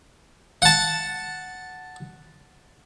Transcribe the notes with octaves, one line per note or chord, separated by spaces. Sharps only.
F#5 A5